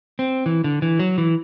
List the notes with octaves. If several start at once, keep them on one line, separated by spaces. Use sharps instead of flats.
C4
E3
D3
E3
F#3
E3